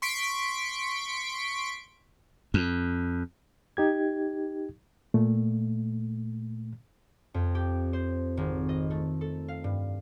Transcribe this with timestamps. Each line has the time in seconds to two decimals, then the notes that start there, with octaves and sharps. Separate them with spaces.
0.02 C6 C#6 B6 D7
2.54 F2
3.77 D#4 G4 G#6
5.14 A#2 A3
7.34 F2
7.55 G4
7.93 C5
8.37 G#1
8.69 D#5
8.90 A3
9.21 A4
9.48 F5
9.64 G2